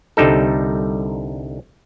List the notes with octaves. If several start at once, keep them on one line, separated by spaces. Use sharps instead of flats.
C2 D3 G3 D#4 A4